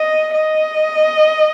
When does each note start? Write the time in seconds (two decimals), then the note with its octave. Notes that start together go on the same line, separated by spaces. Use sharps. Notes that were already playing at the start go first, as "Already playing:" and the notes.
Already playing: D#5
0.34 D#5